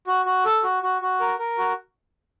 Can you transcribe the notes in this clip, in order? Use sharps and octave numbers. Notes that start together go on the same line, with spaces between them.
F#4
F#4
A4
F#4
F#4
F#4
A#4
A#4
F#4